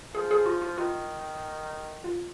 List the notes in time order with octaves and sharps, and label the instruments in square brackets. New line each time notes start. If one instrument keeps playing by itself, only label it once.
[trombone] F3 [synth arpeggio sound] G#4
[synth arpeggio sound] G#4
F4
F4
[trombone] D#3 [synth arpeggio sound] F4
[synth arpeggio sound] F4